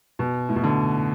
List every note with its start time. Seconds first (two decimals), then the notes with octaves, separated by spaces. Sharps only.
0.19 B2
0.49 A2
0.56 B2
0.64 D3